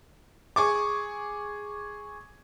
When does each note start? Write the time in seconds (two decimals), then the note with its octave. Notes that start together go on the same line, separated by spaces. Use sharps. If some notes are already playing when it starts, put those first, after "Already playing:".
0.56 G#4 C#6 D6